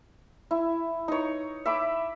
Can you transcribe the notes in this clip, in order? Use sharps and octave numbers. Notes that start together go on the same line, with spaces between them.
E4
D#4 C#5
E5 B5 D6